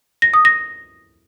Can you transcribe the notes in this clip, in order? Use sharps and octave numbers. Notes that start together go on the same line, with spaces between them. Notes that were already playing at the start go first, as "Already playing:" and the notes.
A#6
D#6
A#6